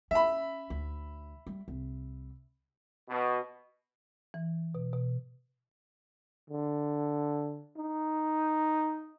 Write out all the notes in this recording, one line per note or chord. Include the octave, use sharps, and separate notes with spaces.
C#4 E5 B5
D2
G3
C2
B2
E3
B2
B2
D3
D#4